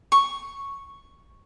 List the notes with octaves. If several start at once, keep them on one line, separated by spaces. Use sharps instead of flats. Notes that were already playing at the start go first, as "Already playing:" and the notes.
C#6